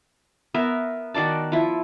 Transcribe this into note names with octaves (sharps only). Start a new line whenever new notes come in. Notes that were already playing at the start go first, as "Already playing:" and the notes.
B3 A#4 E5
D#3 F#4 D5 A5
F3 E4